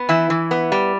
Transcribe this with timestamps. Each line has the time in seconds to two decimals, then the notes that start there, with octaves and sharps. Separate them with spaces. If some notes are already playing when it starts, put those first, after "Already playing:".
Already playing: B3
0.09 E3 E4
0.30 E3
0.51 B3
0.72 G3